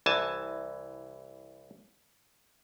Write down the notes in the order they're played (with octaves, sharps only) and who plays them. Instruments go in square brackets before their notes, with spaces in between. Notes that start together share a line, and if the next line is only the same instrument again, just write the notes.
[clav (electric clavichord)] C2 E3 G#5 A5